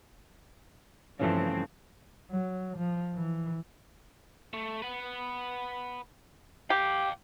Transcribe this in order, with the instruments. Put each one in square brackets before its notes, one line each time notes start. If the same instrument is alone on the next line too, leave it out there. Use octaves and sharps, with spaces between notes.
[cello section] G2 F3 C4 [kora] C#3 E3 A3
[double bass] F#3
F3
E3
[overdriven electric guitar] A3
B4 F#5
[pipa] G4 [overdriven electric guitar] F5 G5